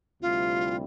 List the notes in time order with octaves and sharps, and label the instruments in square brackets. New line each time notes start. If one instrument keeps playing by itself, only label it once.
[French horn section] D2 C3 G3 C4 E4 [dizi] F4